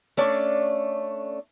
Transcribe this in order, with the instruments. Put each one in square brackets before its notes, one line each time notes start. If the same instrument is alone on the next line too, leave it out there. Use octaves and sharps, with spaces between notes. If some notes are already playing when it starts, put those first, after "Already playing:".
[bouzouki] A3 C#4 D4 D5